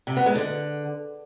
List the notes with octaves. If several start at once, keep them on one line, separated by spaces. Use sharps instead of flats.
C3
B3
G#3
D3